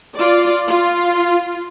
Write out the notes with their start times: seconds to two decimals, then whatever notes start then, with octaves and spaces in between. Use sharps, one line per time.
0.15 F4 D5
0.67 F4